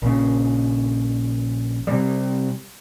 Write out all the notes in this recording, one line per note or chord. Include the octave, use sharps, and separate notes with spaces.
A#1 C#3
C3 G3